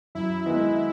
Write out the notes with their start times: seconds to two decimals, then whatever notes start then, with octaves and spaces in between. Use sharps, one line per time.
0.15 F#2 E4
0.46 D#3 G#3 B3 D#4